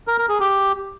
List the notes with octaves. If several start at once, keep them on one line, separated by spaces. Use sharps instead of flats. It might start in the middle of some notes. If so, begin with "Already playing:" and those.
A#4
A#4
G#4
G4